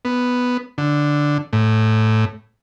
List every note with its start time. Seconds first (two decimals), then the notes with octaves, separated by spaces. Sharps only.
0.05 B3
0.78 D3
1.53 A2